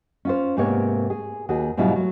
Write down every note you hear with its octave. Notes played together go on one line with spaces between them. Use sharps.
C#4 F4 C5
G#2 C3 A#3 B3 C#5
G#4
D#2 F#4 G#4
G#2 B2 F#3 G3 E4 F4
F#3 A3